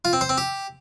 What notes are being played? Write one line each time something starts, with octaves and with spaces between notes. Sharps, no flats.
F4
C4
C5
C4
G4